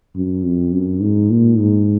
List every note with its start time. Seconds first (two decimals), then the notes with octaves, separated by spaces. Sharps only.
0.16 F#2
0.45 F2
0.73 F#2
1.01 G#2
1.31 A#2
1.59 G#2